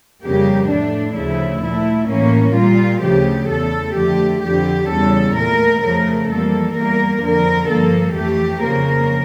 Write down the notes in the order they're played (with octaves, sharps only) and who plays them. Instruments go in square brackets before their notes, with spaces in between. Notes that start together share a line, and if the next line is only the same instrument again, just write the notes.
[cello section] F2 C#3 G3 A#3 G4
A2 E3 A3 D4
D2 C#3 F3 A3 E4
A#2 A3 E4
A2 E3 A#3 C#4
A#2 G3 A#3 F4
D2 C#3 F3 A3 G4
E2 E3 A3 A4
F2 D3 A3 G4
F2 D3 F3 G4
E2 C#3 G3 A4
A#2 A3 A#4
F2 C#3 F3 A3 A#4
F2 E3 G3 A#3 A4
E2 E3 G3 A#3 A#4
F2 D3 F3 A#4
G2 F3 A#3 A4
F2 E3 A3 G4
F2 C#3 F3 A#3 A#4